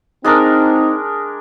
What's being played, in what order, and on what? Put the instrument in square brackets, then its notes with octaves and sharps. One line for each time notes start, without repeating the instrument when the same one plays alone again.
[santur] G#3 D4 A#4 [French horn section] C4 D#4